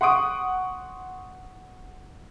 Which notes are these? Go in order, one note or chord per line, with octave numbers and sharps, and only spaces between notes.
F#5 C6 C#6 D#6 D7